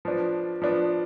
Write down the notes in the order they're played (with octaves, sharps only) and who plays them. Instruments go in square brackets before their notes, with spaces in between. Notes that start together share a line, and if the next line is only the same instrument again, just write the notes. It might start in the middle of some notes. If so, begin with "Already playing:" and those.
[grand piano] F3 B3 D4
F3 B3 D4